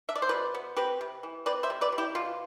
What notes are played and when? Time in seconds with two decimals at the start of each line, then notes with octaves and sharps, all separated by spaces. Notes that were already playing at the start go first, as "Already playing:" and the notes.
0.09 D4 E5
0.16 D5
0.22 C5
0.29 B2 B4 D5
0.54 B3
0.76 C4 G4 B4
1.01 C3
1.23 E3
1.46 C4 B4 D5
1.63 C5 E5
1.70 C3
1.81 B4 D5
1.92 C3
1.98 E4 G4
2.15 B2 F4